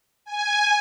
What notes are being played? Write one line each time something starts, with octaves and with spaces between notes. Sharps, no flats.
G#5